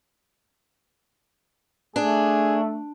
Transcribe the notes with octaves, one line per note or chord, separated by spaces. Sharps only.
A3 D4 G#4